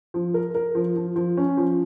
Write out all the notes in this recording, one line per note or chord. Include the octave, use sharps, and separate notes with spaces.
F3
A#4
A#4
F3
F3
F3
C#4
F3